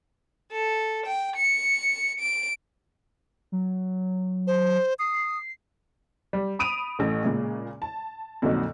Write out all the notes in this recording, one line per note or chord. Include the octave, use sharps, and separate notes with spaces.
A4
G5
C#7
D7
F#3
C5
D#6 C7
G3
B5 D#6 D7 D#7 F7
A1 A2
A#2 C#3 G#3
A5
F2 A#2 D3 F#3 D#4